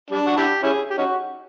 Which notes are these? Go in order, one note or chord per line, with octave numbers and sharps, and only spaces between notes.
G3 D4
F#4
D4 E4 G4
C#4 E4 G#4
G4
C#4 D#4 F#4